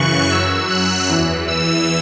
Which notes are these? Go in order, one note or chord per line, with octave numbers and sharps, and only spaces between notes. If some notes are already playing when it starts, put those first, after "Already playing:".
Already playing: F#2 C#3 E3 C#6 F#6
F#2 F#3 E6
F#6
E2 E3
E6